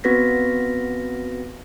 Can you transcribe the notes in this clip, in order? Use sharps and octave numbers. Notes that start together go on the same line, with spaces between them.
B3 C4 F#4 B4 A#6 B6